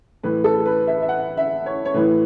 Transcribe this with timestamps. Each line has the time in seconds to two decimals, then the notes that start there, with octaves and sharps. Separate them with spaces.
0.23 A2 E3 B4
0.44 A4
0.66 B4
0.87 E5
1.02 E5
1.09 F#5
1.37 E5
1.66 C#5
1.85 C#5
1.94 A2 E3 B4